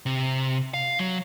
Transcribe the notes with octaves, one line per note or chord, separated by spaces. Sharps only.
C3
F5
F#3